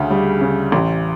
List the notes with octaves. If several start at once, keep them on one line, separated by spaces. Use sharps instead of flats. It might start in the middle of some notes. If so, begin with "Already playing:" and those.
Already playing: D2 C#3
G3
C#3
A1